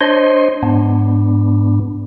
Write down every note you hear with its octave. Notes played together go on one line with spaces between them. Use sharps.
D4 C5 C#5 D#5 C6
G#2 B3 D4